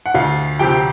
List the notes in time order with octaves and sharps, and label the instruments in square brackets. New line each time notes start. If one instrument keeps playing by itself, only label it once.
[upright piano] F#5
D2 F4 F5
C3 F3 G4 G5